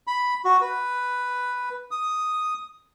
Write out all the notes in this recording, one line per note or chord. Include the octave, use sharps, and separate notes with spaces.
B5
F#4
B4
D#6